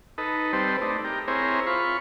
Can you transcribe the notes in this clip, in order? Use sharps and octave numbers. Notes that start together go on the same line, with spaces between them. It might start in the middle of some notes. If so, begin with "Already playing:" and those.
D#4 A4 B4
G3 C4 A4 B4 C5
A3 D4 D#4
G4 A#4
C4 E4 G#4 A#4 C5 C#5
F4 B5 C#6